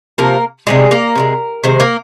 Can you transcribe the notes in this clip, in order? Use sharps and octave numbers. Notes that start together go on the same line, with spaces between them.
C3 F3 A#3 A#4
C3 D#3 G3 G#3 G#4
A#3 A#4
C3 F3 G#3
C3 D#3 G#3 C5
A#3 A#4